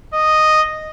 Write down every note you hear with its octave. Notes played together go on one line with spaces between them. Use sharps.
D#5